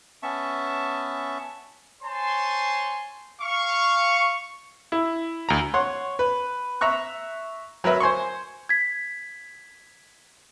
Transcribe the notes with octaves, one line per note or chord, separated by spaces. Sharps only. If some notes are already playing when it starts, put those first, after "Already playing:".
B3 C#4 E5 A5 C#6
C5 C#5 G#5 A5 C6
F5 C#6
E4
D2 A#5
C#5 F#5 C6
B4
E5 A#5 C#6 F#6
F#3 A#4 B4 E5
C5 G#5 C6 C#6
G#6 B6